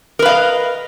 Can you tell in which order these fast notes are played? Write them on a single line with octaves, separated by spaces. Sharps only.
A#4 B4 F5 D#5